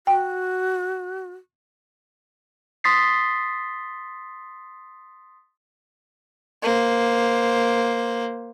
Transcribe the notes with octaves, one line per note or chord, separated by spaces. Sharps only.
F#4 G5
C6 D#6 A6 B6 C7
A#3 C5